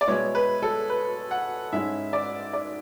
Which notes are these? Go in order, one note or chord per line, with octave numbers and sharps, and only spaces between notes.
D5
B2 G#3 B3 E4 C#5
B4
A4
B4
F#5
G#2 G#3 C#4 E4 E5
D5
D5